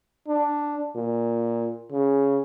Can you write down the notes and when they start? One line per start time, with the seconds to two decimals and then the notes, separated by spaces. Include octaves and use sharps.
0.28 D4
0.96 A#2
1.92 C#3